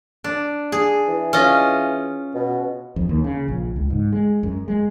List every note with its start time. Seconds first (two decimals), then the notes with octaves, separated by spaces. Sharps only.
0.24 D4
0.72 G#4
1.08 E3
1.33 C#4 F4 D#5
2.34 B2
2.96 F2
3.09 D#2
3.24 C#3
3.48 A#1
3.76 C#2
3.90 G#2
4.13 G#3
4.43 F#2
4.68 G#3